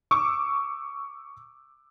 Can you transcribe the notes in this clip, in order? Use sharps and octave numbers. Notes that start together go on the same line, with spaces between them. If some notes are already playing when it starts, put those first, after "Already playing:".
C#6 D6 E6